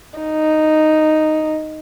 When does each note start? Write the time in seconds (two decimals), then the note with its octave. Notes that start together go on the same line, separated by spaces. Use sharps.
0.19 D#4